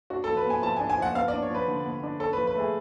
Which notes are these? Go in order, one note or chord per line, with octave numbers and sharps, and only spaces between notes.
D4 F#4
A4
F3
B4
B3 G#5
F3 A5
G#5
D4
G#5
F3 F#5
B3 F5
D5
D4
C#5
F3 B4
D3
B3
D4
C#4 A4
B4
F3
B4
A3 G#4